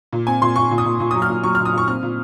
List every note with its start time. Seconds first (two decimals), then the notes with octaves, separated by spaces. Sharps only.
0.13 A#2
0.27 C4 G#5
0.42 A#2 C6
0.56 A#2 C#6
0.71 A#2
0.78 D#6
0.85 A#2
1.00 A#2
1.11 F#3 D#6
1.22 F6
1.30 A#2
1.43 F#3 C#6
1.55 F6
1.59 A#2
1.65 D#6
1.73 A#2 C#6
1.88 C4 F6
2.03 A#2